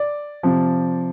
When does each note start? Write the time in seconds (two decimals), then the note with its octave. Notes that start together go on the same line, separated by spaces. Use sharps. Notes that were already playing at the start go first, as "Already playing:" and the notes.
Already playing: D5
0.43 C3 F3